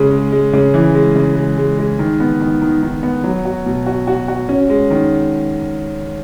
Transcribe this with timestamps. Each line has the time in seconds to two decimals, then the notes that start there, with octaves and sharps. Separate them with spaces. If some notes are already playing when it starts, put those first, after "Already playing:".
Already playing: C#3 G#3 C#4
0.11 G#3
0.32 G#3
0.53 C#3
0.74 E3
0.95 G#3
1.16 C#3
1.36 G#3
1.58 G#3
1.79 G#3
1.99 D#3
2.20 B3
2.41 D#3
2.62 D#3
2.82 D#3
3.03 B3
3.24 F#3
3.45 F#4
3.66 B2
3.87 F#4
4.07 F#4
4.28 F#4
4.49 C#4
4.70 G#3
4.91 D#3